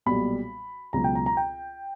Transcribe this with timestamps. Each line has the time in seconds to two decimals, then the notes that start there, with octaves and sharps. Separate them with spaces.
0.06 B1 A#2 G3 B5
0.93 C#2 B2 F#3 A#5
1.04 G5
1.15 A#5
1.26 A#5
1.37 G5